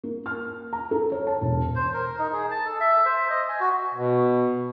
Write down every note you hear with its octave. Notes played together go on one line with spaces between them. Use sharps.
A#3
F6
A#5
A4
C#5
A5
E1
C5
A#4
D#4
G#4
A5
A4
E5
C5
D#5
G#5
F#4
B2